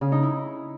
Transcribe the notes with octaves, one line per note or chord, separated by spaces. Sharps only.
C#3
D#4
E4